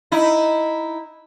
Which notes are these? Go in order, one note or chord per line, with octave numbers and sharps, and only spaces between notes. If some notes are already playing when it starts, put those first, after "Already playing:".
D#4 E4